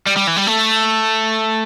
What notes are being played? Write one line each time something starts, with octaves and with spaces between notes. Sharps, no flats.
G3
G3
E3
G3
A3